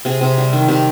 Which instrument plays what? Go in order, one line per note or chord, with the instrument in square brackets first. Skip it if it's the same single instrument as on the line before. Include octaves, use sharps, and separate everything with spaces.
[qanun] C3 G#4
C3
G3
D#3
C3 G4